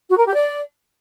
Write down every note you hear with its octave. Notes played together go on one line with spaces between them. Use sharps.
F#4
A#4
G4
D5